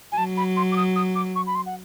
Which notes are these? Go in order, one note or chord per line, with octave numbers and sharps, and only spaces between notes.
G#5
F#3 A5
B5
C6
D6
D#6
D#6
D6
C#6
B5
C6
F#5